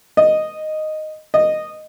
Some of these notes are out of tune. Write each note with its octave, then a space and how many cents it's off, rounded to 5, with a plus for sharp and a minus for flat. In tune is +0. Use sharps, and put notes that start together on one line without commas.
D#5 -5
D#5 -10